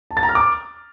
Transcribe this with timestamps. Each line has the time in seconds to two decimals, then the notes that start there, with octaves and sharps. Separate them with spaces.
0.11 A5
0.17 A6
0.23 A#5
0.29 F6
0.35 D6